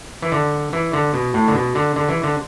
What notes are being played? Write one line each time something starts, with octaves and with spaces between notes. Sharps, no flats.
E3
D3
E3
D3
B2
A2
D3
B2
D3
D3
E3
D3